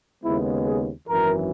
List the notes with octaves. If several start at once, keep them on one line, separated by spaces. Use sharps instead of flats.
D#2 C#3 G#3 B3 E4
G#4
G#1 F#2 E3 A#4